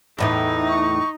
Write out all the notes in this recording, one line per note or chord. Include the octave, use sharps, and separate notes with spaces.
E2 A2 E3 D#4
C#6